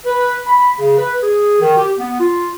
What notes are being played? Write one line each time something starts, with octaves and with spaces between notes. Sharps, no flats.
B4
B5
C#3
B4
G#4
D#3
G4
B3
F4